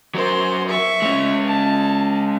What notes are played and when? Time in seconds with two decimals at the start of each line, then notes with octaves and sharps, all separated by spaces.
0.15 F#3 A#4 C5 C6
0.68 E5 C#6
1.02 G#3 C#4
1.47 A5